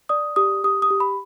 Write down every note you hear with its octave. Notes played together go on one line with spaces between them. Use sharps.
D5 D#6
G4 D#6
G4 D#6
D#6
G4
B5